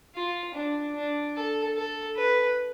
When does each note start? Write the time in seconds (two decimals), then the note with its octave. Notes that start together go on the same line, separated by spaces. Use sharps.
0.15 F4
0.54 D4
0.95 D4
1.35 A4
1.75 A4
2.16 B4